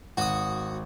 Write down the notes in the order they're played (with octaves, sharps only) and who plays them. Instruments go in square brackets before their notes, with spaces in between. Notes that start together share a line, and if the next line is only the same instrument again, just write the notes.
[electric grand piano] G#1 [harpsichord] F#4 D#6